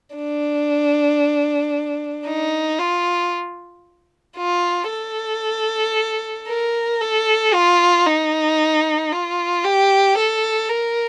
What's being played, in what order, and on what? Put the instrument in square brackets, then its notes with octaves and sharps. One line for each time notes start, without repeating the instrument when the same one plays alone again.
[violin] D4
D#4
F4
F4
A4
A#4
A4
F4
D#4
F4
G4
A4
A#4